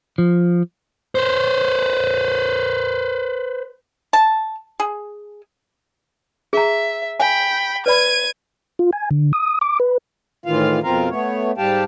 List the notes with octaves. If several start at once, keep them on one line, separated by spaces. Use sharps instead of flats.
F3
B4 C5
A5
G#4
G#4 E5 A#5
G5 G#5 B5
B4 D5 B5 G#6 D#7
F4
G#5
D3
D#6
D6
B4
A2 D#3 E3 F4 F5
F2 B2 C4 F4 A#4 F5
A3 B3 C#5
G#2 G3 G4 F5 G5 A5